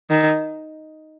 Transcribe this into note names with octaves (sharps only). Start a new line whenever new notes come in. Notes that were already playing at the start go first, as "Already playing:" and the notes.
D#3